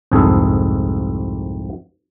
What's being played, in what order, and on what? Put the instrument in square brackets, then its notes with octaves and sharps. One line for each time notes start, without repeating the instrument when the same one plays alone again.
[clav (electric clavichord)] C2 F2 G#2 G#4 A4